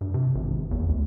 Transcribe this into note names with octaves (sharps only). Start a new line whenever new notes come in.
G2
C3
G#1
G#1
E2
D2